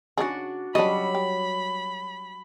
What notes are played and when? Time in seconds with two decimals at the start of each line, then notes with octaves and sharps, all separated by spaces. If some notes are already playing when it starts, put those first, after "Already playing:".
0.18 C#3 D4 D#4 F#4 G#4
0.75 C#3 F#3 G3 D4 D#5 B5
1.15 G4